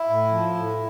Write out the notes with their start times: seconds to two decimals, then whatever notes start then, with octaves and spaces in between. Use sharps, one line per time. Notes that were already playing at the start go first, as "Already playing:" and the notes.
Already playing: E4
0.08 A2
0.31 F3
0.55 A2